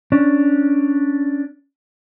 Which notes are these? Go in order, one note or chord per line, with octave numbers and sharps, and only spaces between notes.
C#4 D4